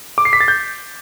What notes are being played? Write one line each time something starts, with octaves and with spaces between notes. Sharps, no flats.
D6
C7
B6
A6
G6